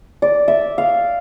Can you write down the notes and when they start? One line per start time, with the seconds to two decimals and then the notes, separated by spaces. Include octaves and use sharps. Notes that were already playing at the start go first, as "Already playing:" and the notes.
0.22 D5
0.48 E5
0.78 F5